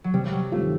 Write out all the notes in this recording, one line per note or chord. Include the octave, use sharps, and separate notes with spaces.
F#3
C3 G3
G3
F#3
D#3 G3 A3 C4 F4